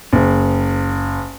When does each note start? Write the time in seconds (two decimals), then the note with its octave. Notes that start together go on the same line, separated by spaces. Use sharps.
0.13 F#1